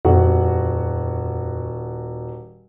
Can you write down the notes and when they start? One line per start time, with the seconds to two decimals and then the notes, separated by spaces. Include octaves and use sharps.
0.05 D#1 F2 F#4 F#5